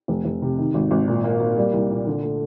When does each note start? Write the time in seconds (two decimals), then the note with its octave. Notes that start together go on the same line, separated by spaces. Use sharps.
0.08 F1
0.25 F1
0.42 C3
0.58 D#3
0.74 G#1
0.91 G#1
1.08 A#2
1.24 A#3
1.40 A#3
1.57 G3
1.73 C2
1.90 A#2
2.06 D3
2.23 A3